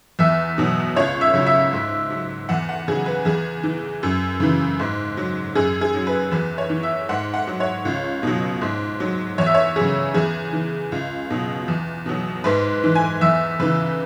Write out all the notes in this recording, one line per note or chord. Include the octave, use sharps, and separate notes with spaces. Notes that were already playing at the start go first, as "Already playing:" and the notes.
E2 E5
B2 F#3
C#2 C#5
E5
C#3 F#3
E5
G#2
F#3
E2 F#5
F#5
C#3 F#3 G#4
B4
E2 G#4
E3
F#2
C#3 E3
G#2
F#3
F#2 G#4
G#4
F#3
B4
E2 B4
C#5
E3
E5
G#2 F#5
F#5
F#3
C#5
C#2
B2 F#3
G#2
F#3
E2 C#5
E5
C#5
F#3 G#4
C#3
E2 G#4
E3
C#2
B2 F#3
E2
B2 F#3
G#2 B4
E3
G#5
E2 E5
C#3 E3 B4